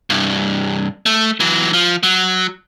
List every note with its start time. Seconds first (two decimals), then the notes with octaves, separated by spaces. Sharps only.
0.10 C2 G2
1.06 A3
1.40 E3 F#3
1.73 F3
2.03 F#3